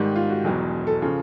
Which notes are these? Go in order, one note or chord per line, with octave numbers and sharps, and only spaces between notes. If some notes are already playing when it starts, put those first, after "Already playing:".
Already playing: G#2 D#3 G3 G4
F4
F#4
E1 E2 B2 F#3
A4
C#3 F3